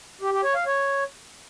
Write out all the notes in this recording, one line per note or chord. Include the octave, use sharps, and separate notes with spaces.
G4
G4
C#5
F5
C#5